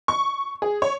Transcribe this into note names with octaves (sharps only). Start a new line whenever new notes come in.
C#6
G#4
C#5